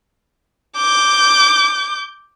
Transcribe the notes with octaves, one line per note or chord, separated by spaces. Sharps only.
D6 G6